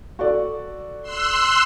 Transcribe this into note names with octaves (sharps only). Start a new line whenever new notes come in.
F#4 A4 D5
C6 E6 F#6